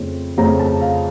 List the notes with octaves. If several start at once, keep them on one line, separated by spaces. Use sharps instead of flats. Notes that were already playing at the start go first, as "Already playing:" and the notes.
Already playing: F2 C#3 A3 C4
F2 C#3 A3 C4 A#5
A5
F5